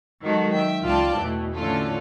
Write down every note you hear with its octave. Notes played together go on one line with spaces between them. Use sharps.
D#3 F#3 G#3 F#4 A4
E5 G5
C#2 E3 F4 D5 G5 A5
E2 B2 E3 A3
A2 D3 E3 C#4 F4 A4